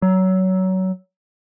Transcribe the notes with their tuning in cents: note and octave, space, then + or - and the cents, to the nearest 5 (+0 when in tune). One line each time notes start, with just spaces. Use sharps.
F#3 +20